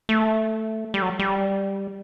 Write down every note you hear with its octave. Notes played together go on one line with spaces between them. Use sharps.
A3
G3
F#3
G3